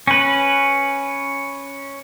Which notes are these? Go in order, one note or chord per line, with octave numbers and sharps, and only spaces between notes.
C#4 B4